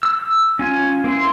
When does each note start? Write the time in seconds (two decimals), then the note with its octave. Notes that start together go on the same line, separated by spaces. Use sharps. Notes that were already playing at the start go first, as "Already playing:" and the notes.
0.03 E6
0.59 C#4 F4 G#5
1.04 A#3 C4 E4 C6